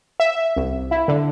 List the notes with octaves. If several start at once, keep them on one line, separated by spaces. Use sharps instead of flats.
E5
C2
E4
D3